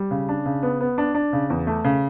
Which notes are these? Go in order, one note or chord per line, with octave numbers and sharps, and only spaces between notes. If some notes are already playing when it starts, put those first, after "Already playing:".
Already playing: G3
C#3
D4
C#3
B3
B3
D4
D4
C#3
E2
A3
C#3